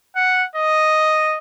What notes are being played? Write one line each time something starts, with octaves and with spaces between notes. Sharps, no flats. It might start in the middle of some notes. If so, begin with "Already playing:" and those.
F#5
D#5